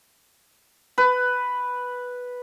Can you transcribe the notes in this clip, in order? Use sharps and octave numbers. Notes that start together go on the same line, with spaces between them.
B4